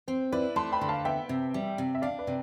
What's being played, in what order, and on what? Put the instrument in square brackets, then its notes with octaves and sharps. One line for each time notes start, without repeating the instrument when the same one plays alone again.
[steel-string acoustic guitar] C4 [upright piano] C5
[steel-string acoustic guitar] E4 [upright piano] B4 D5
[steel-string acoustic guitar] A3 [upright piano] A5 C6
[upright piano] G5 B5
[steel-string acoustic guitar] D3
[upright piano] F5 A5
[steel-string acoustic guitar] B3 [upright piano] E5 G5
[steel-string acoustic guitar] C3
G3
C3
[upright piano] E5
[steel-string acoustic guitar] D4 [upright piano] D5 F5
[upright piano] B4 D5
[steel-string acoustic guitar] C3